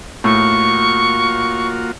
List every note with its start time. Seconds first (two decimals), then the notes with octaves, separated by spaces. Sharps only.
0.24 A2 A#3 F4 F#4 C#6